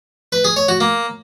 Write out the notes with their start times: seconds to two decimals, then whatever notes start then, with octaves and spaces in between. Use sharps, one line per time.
0.32 B4
0.44 G#4
0.56 C#5
0.68 F#4
0.80 A#3